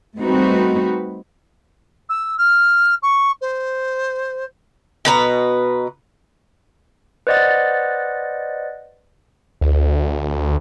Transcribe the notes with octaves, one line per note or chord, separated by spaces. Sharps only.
G3 A3 C4 D#4 F#4 B4
E6
F6
C#6
C5
B2 B4 A#5
B4 C5 D5 D#5 F#5 A6
D2